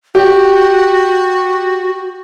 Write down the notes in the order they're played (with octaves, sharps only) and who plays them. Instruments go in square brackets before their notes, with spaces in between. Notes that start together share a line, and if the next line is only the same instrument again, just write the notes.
[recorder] F#4 [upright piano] G4